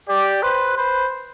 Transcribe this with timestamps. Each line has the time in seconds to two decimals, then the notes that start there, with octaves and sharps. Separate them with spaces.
0.09 G4 D5
0.42 B4 C5
0.77 B4 C5